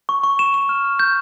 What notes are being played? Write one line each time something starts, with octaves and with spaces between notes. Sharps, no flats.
C#6
C#6
E7
E7
F6
F6
G6